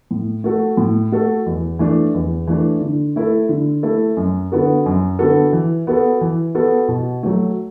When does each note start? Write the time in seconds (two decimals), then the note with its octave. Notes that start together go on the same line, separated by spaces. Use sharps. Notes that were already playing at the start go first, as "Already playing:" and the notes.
0.11 A2
0.44 A3 F#4 A4
0.77 A2
1.12 A3 F#4 A4
1.46 E2
1.79 E3 A3 D4
2.14 E2
2.47 E3 A3 D4
2.81 D3
3.16 A3 E4 A4
3.49 D3
3.83 A3 E4 A4
4.17 F#2
4.52 D3 B3 F#4 A4
4.86 F#2
5.19 D3 B3 F#4 A4
5.53 E3
5.87 B3 F#4 A4
6.21 E3
6.55 B3 F#4 A4
6.88 B2
7.23 F#3 A3